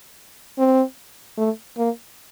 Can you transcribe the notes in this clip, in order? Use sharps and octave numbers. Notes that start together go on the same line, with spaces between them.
C4
A3
A#3